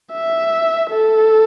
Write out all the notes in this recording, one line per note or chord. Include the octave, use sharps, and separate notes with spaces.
E5
A4